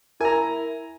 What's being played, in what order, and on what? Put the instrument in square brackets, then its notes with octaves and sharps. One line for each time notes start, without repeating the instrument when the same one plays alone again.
[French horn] E4 [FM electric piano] A#4 E5 [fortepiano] G#5 A#5